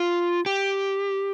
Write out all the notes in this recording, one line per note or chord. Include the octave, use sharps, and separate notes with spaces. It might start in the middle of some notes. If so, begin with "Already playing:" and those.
Already playing: F4
G4